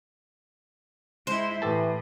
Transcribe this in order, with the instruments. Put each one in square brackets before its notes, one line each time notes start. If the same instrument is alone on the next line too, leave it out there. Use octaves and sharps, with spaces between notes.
[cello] G#3 E4 [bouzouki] C5
[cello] A2 [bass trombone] E3 [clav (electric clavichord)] G4 A4 A5